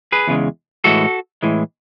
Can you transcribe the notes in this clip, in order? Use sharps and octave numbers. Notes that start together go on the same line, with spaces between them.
G#4 B4
E2 C#3 G#3
A2 E3 G#3 F#4 A4
A2 E3 G#3